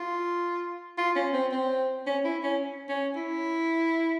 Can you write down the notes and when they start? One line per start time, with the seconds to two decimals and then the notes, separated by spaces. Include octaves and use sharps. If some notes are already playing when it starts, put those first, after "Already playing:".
Already playing: F4
0.98 F4
1.16 C#4
1.34 C4
1.52 C4
2.07 C#4
2.25 E4
2.43 C#4
2.89 C#4
3.16 E4